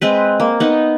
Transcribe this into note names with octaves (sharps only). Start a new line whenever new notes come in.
G#3 C4 B4
A#3
B3 D#4